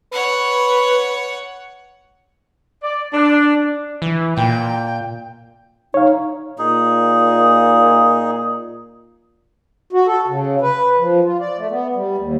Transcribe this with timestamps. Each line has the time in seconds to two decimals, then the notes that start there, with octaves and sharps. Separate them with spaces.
0.12 B4 C#5 F#5
2.83 D5
3.14 D4
4.02 E3
4.37 A#2 G5
5.94 D#4 C#5 F5
6.58 A#2 D#4 G#4
9.93 F#4
10.07 A4
10.28 C#3
10.61 B4
11.00 F3
11.25 F4
11.40 D5
11.58 A3
11.71 B3
11.96 G3
12.18 D#2